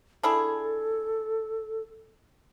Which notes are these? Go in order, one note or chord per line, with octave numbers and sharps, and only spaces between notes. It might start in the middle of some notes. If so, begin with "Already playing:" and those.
D4 E4 G#4 A4